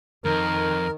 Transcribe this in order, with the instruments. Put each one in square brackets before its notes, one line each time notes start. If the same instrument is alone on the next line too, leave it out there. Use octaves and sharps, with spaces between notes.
[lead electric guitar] F2 [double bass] D#3 [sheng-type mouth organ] A#4